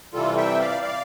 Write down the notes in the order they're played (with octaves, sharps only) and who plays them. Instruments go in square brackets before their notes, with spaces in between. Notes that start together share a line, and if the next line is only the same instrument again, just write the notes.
[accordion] C3 E3 G3 F4 A4
E5 G5
D5 F5
D5 F5